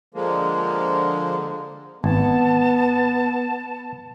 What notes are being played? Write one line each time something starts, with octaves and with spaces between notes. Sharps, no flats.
D3 F3 G#3 A#3
G#1 B3 A5